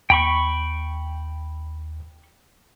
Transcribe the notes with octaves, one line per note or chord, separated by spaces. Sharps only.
D#2 G5 B5 C#6